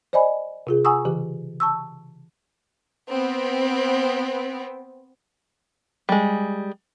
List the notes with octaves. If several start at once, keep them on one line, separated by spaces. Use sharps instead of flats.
C5 D5 D#5 G#5 B5
C3 F4 G#4
F#5 G#5 A#5 C#6 D#6 E6
C#3 E3 G4
A5 C#6 E6
B3 C4
G3 G#3